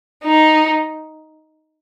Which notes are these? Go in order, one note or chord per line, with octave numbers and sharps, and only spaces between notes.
D#4